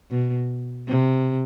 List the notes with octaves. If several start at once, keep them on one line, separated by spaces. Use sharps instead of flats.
B2
C3